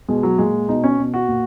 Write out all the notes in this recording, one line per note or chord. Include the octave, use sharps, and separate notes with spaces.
B2 G#3
F#3
A#2 G#3
B2 D#4
C#4
B2
F#4
A#2